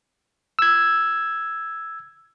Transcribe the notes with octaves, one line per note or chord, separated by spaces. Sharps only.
E6 G#6